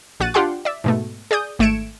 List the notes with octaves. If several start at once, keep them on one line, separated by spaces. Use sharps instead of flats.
A#1 F#4 F#6 A6 D#7
D4 F4 G4 F#5 G5 C6
D5 E5
G#2 B2 A3
G#4 D5 D#6 G6
G#1 A3 G#6 C#7 D7 E7